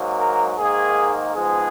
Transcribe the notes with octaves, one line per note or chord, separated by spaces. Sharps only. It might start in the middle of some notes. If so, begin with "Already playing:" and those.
Already playing: G#2 F#3 A#3
A#4
G#2 D#3 A#3 G#4
G#2 F3 G#3 B3 G#4